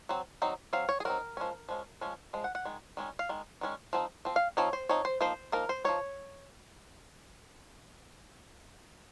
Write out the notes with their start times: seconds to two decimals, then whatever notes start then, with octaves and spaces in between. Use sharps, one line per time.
0.09 F#3 C4
0.42 F#3 C4 D#4
0.73 F#3 C4 F5
0.89 C#5
1.00 G#4
1.05 F#3 C4 D#4 A#4
1.37 F3 G#3 C#4
1.69 F3 G#3 C#4
2.01 F3 G#3 C#4
2.33 F3 G#3
2.44 F#5
2.55 F#5
2.65 D#3 G#3
2.97 D#3 G#3 C#4
3.19 F5
3.29 D#3 G#3
3.61 D#3 G#3 C#4
3.93 F3 C4 D#4
4.25 F3 C4
4.36 F5
4.57 F3 C4 D#4 C#5
4.73 C5
4.89 F3 C4 D#4 C#5
5.05 C5
5.21 F3 A#3 D#4 C5
5.52 F3 A#3 D#4 A#4
5.69 C5
5.84 F3 A#3 D#4 C#5